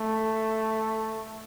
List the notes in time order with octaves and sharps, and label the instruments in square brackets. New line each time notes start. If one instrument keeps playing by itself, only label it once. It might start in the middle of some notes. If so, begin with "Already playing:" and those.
Already playing: [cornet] A3